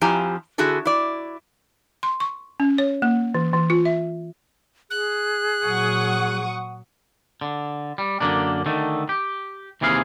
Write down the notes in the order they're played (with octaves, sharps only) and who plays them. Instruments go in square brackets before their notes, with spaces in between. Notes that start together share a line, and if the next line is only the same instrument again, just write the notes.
[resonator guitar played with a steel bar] F2 F3 E4 G4 G#5 A#5
D3 E4 F#4 G#4 A4
E4 D5
[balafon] C6
C#6
C#4
C#5
A#3
E3
E3
F4
E5
[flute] G#4 [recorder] F#6
[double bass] A#2 F#3 [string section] F#5 C#6 D#6
[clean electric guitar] D3
G3
F#2 D3 A#3 D4
D3 D#3 A3
G4
D#2 C3 E3 G#4 F5